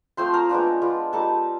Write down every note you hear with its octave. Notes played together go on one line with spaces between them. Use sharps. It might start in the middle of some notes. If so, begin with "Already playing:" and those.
F3 A3 C4 C5 C6
A#4 A#5
G#3 B3 D4 F4
G#3 B3 D4 F4
G3 A#3 D#4 A4 A5